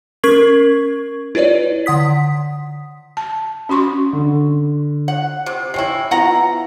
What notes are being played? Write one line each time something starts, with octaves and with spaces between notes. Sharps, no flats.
C#4 A#4 C#6 G#6 C7 F#7
E4 F4 B4 C#5 D5
D3 F#5 D#6 B6
A5
C#4 F#4 C6 C#6
D3
F#5
C3
C4 C#4 E4 G5 G#5 C7
B3 E4 F4 D#5 F#5 A#5